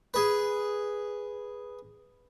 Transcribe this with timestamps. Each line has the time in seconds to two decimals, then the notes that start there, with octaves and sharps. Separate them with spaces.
0.14 G#4 B4